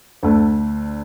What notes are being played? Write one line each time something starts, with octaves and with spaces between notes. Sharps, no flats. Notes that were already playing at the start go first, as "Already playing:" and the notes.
D2 D3 A3